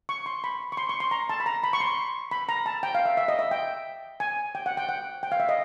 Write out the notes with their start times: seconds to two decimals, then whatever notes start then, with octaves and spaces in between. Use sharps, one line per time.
0.09 C#6
0.26 C6
0.44 B5
0.72 C#6
0.77 C6
0.89 C#6
1.00 C6
1.11 A#5
1.29 A5
1.40 B5
1.46 A#5
1.64 B5
1.73 C#6
1.80 C6
2.31 B5
2.49 A#5
2.66 A5
2.83 G5
2.95 F5
3.05 E5
3.17 E5
3.28 D#5
3.39 E5
3.51 G5
4.20 G#5
4.55 G5
4.66 F#5
4.77 G5
4.89 F#5
5.23 G5
5.32 F5
5.40 E5
5.49 D#5